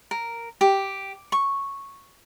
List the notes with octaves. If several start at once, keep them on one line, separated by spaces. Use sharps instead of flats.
A#4
G4
C#6